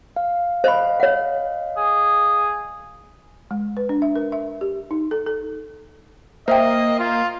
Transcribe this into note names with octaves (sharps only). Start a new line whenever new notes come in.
F5
C5 D#5 F5 B5
C#5 F#5
G#4
G#3
B4
D4
E5
A#4
E5
G4
D#4
A4
A4
A#3 C5 D#5 E5 G5
F4